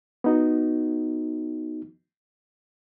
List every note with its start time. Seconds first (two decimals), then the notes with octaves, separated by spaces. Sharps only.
0.24 B3 D#4 F#4